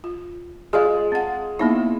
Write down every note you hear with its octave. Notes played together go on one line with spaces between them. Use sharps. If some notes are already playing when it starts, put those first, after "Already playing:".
F4
G#3 F4 G#4 D5 D#5
C4 F#5
A#3 B3 D#4 E4 E6